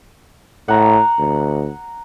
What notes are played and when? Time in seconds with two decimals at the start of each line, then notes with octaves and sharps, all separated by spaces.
0.68 A2 F#5 A#5
1.19 D2